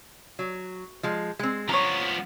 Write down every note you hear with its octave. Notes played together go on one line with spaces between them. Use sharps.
F#3
F3 G#3
G#3 C4
F3 B3 D4 C#5 A#5